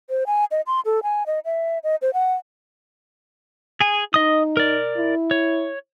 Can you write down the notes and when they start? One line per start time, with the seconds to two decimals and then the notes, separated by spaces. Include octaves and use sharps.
0.10 C5
0.27 G#5
0.51 D#5
0.67 C6
0.85 A4
1.03 G#5
1.26 D#5
1.45 E5
1.84 D#5
2.02 C5
2.14 F#5
3.81 G#4 G#5
4.14 D#4 D#5 D#6
4.57 A#4 D5
4.97 E4
5.31 C#5